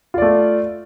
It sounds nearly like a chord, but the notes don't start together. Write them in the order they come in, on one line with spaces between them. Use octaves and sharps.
F4 D5 A3